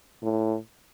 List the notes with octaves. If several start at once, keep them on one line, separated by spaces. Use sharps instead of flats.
A2